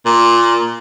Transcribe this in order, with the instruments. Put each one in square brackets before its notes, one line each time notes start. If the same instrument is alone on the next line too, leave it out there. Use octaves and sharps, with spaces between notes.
[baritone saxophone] A#2